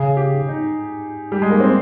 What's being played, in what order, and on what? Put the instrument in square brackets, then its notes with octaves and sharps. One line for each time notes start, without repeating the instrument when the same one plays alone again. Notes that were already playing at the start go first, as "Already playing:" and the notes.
Already playing: [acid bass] C#3 [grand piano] G#4
[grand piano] G4
D#4
G3
G#3
A#3
C4